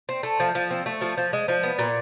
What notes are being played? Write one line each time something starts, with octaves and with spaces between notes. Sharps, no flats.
C4
A3
F3
F3
C4
A3
F3
F3
G#3
F3
B3
A#2